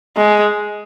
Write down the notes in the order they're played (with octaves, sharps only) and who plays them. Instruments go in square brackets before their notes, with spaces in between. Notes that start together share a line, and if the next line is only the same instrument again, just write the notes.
[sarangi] G#3